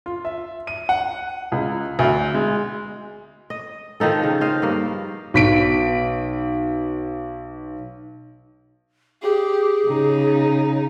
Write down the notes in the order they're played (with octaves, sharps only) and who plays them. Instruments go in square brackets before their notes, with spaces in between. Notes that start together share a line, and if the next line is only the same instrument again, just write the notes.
[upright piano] F4
E5
D#7
F#5
C#2
D2
G#3
[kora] D#5
D#3 F3 D#4 A4
C#3
C5 D#5 F5
G2 A#3
[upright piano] B1 B6 D7
[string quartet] G4 [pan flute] G#4
[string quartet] C#3 D#4